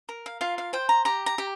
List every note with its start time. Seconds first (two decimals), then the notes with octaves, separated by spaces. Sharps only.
0.09 A#4
0.26 F5
0.41 F4 F5
0.58 F5
0.73 C5 G5
0.89 A#5
1.05 G4 A#5
1.26 A#5
1.38 G4